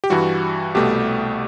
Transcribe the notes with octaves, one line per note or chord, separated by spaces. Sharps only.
G4
G2 E3 G3 F#4
C2 B2 A3 G4